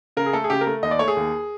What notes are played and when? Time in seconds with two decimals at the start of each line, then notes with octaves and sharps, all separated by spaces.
0.17 C#3 A#4
0.26 G#4
0.33 A3 A4
0.44 G#4
0.50 C#3 G4
0.61 A#4
0.67 A3
0.83 D#2 D#5
0.91 D5
0.99 A3 C#5
1.08 G#4
1.17 D#2